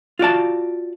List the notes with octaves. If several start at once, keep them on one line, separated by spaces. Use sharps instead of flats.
F4 F#4 D5 A5